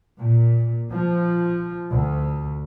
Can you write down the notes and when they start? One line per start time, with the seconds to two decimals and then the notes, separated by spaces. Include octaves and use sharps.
0.21 A#2
0.92 F3
1.90 D2